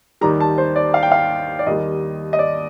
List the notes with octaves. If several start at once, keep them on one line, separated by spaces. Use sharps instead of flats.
D#2 D#3 G3 A#5
A5
C5
D5
F5
G5
F5
D5
D#2 D#3 G3 D#5
D#5
D5